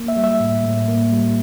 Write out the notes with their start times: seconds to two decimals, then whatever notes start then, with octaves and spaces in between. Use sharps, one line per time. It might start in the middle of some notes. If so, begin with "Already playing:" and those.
Already playing: A#3
0.08 E5
0.17 G3
0.24 E5
0.40 A2
0.64 A2
0.88 A#3
1.12 G3